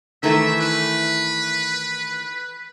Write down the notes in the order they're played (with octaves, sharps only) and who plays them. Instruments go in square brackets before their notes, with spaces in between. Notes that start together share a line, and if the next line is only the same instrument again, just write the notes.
[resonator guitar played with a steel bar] D#3 E3 A3 [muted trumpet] E5
[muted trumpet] B4